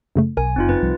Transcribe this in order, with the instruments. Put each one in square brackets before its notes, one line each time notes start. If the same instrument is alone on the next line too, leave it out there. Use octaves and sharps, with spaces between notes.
[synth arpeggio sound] F#2 C#3 A3
[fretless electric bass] B1 [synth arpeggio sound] A#4 [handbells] G#5
[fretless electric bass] F#1 [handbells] C4 D#4 F4
[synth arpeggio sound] F#2 [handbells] B4 A6
[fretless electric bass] C2 F3 G3